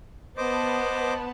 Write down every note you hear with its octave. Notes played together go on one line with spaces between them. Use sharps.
B3 C5 D#5 A5 D6